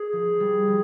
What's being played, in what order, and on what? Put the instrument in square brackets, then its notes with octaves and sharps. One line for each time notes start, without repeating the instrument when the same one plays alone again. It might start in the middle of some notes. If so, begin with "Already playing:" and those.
Already playing: [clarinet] G#4
[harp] F3
G3
F3